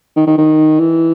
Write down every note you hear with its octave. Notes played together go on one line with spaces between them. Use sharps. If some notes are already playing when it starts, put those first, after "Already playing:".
D#3
D#3
D#3
E3